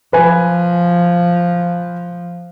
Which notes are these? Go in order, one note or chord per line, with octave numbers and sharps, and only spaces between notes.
F3 B4 G#5